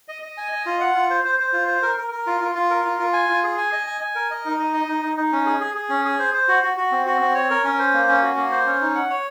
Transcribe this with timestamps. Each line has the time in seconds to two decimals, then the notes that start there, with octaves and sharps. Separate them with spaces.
0.08 D#5
0.22 D#5
0.37 G#5
0.52 D#5
0.66 F4
0.80 F#5
0.95 F4
1.10 C5
1.24 C5
1.40 C5
1.53 F4
1.68 C5
1.82 A#4
1.98 A#4
2.12 A#4
2.27 F4
2.41 F4
2.55 F4
2.70 A#4
2.85 F4
2.99 F4
3.13 G#5
3.29 F4
3.43 G#4
3.58 G#5
3.72 D#5
3.87 G#5
4.01 G#5
4.15 A#4
4.30 D#5
4.45 D#4
4.60 D#5
4.73 D#5
4.89 D#4
5.02 D#4
5.17 D#4
5.32 C#4
5.46 G#4
5.61 G#4
5.75 G#4
5.89 C#4
6.05 G#4
6.19 C5
6.33 C5
6.48 F#4
6.63 F#4
6.77 F#4
6.92 C4
7.06 F#4
7.21 C4
7.35 C#5
7.50 A#4
7.64 C#4
7.79 C5
7.94 A#3
8.09 C#4
8.23 F#4
8.37 A#3
8.51 C5
8.66 C#4
8.81 D#4
8.95 F#5
9.10 C#5